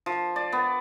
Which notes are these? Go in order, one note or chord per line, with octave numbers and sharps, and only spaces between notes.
F3
D5
B3